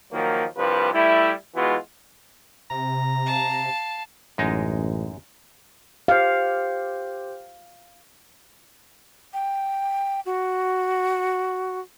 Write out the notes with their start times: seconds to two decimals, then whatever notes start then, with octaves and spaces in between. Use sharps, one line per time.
0.13 D#3 F3 F#3 A#3
0.57 C2 G2 F3 G3 B4
0.93 G3 A3 E4
1.55 E3 G#3 B3 F4 F#4
2.71 C3 A#5
3.26 F5 A5
4.38 A1 F#2 G#3 D#4
6.08 G4 C5 F5
9.33 G5
10.26 F#4